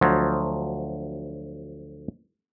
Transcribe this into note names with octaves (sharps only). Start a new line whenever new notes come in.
D2 F3 F#3